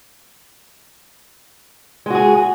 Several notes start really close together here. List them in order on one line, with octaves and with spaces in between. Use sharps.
G#3 F#4 G#4